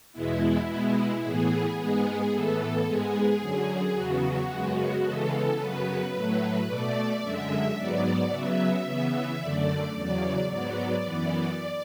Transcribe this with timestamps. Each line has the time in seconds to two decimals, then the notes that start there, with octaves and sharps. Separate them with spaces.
0.13 E2 B2 G#3 B3 E4
0.67 B2 G#3 B3
1.22 A2 E3 B3 G#4
1.76 G#2 G#3 B3 G#4
2.31 A2 E3 B3 A4
2.85 G#2 G#3 B3 G#4
3.40 F#2 D3 F#3
3.94 E2 C#3 F#3 B3 F#4
4.49 F#2 C#3 G#3 B3
5.03 C#3 E3 G#3 B3 A4
5.58 F#2 C#3 F#3 B3 B4
6.13 A2 F#3 A3
6.67 B2 A3 D5
7.21 F#2 D3 G#3 E5
7.76 G#2 F#3 B3 D5
8.31 C#3 F#3 B3 E5
8.85 C#3 E3 B3
9.40 F#2 D3 A3 D5
9.94 E2 C#3 F#3 D5
10.49 G#2 F#3 B3 D5
11.03 F#2 E3 B3